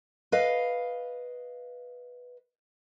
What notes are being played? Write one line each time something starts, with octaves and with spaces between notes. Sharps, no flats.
B4 D#5 F5